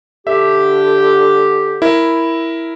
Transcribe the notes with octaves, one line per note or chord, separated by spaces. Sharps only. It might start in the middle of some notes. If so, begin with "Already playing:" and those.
D3 G4 E5
E4 A#4